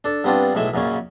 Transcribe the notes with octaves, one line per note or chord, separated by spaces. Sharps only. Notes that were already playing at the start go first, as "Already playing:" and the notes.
D4 A4
G2 B3 C4 D4 F4
B1 A2 G#3 E5
F#2 A#2 C#3 C#4